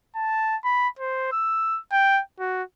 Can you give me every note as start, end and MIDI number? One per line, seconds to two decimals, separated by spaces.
0.16 0.56 81
0.64 0.88 83
0.99 1.32 72
1.32 1.80 88
1.92 2.22 79
2.40 2.63 66